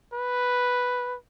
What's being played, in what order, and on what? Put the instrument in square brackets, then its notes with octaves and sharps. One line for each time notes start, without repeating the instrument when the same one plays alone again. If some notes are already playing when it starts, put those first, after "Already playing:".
[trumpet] B4